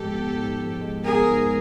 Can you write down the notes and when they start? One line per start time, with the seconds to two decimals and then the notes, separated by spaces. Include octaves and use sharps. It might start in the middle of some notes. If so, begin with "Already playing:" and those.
Already playing: G#2 F3 G#3 B3 G4 A4
0.15 B3
0.37 G#2
0.59 F3
0.81 G#3
1.03 B3 G#4 A#4
1.26 G#2